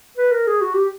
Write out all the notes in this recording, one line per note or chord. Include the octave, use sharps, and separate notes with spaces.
B4
A#4
G#4
F#4
G4